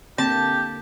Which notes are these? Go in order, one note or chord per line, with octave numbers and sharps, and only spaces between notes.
D3 A#3 C4 G4 A5